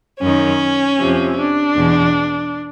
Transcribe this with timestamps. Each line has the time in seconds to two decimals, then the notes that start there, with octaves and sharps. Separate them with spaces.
0.20 F#2 D#3 C#4
0.98 F2 C3 F3
1.36 D4
1.75 E2 B2